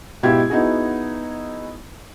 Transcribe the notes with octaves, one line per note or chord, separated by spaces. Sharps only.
G#2 B2 E4 F4 G4 G#6
B3 D#4 E4 F#4 G#4